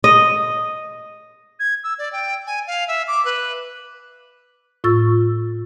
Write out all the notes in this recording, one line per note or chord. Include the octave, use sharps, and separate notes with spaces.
D#5
G#6
E6
D5
G5
G#5
F5
E5
D6
B4
A2 F4 C#6 E6 A6